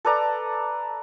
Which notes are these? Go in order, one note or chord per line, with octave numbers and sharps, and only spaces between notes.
A4 B4 D5 A#5